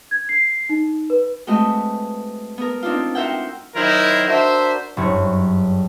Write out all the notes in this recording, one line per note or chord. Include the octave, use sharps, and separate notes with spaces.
G#6
C7
D#4
B4
G#3 A3 C4 F#4 B4 D#5
B3 A#4
C4 D4 D#4 F4
F#4 A#4 C5 E5 F#5 G5
D#3 F#3 D#4 E4 A#4 C5
D4 F#4 A#4 C5 E5
F#1 G2 C#5